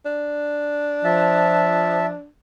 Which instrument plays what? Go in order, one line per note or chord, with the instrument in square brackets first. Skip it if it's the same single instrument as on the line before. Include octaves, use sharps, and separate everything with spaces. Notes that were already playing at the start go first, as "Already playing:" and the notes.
[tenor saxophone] D4
[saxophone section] F3 [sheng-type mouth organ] E5 A5